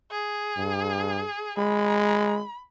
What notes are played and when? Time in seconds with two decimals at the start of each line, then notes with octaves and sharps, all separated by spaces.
0.11 G#4
0.57 G2
1.58 G#3 B5